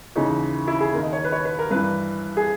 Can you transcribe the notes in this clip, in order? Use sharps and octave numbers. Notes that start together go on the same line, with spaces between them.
D#2 C#3 E3 D#4
E4
G#4
D#2 D#3 A#4
D#5
C#5
B4
C#5
B4
A#4
G2 E3 B4
G#4